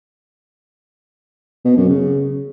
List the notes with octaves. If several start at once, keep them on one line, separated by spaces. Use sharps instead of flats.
B2
F#2
C#3